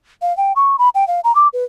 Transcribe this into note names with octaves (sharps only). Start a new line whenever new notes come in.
F5
G5
C#6
B5
G5
F5
A#5
D6
B4